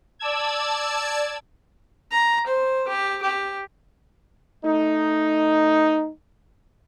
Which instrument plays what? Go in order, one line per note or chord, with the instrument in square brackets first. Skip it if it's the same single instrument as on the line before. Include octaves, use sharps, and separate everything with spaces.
[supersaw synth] D5 A5 E6 G#6
[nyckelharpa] A#5
C5
G4
G4
[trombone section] A3 D#4